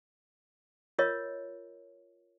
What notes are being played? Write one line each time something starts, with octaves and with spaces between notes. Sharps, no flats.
F4 A#4 C#5 D#5